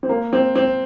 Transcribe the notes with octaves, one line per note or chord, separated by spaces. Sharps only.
C4
A#3
C4
C4